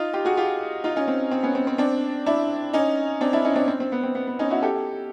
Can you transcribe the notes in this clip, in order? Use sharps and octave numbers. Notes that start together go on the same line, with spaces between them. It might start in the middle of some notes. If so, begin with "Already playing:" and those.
Already playing: D#4 F4
F4 G4
F#4 G#4
F4 G4
D#4 F4
C#4 D#4
C4
C4
B3 C#4
C4
C4
C4 D4
D4 E4
C#4 D#4
C4 D4
D4 E4
C#4 D#4
C4 D4
C4
C4
B3
C4
B3
B3
C#4 D#4
E4 F#4
G4 A4